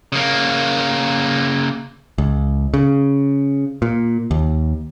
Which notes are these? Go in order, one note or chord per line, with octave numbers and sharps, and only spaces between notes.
C#3 A#3
C#2
C#3
A#2
D#2